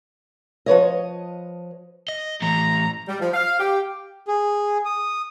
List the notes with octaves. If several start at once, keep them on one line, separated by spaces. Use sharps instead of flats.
F3 B4 C#5 D#5
D#5
A2 E3 A#5
G3
F3
F5
G4
G#4
D#6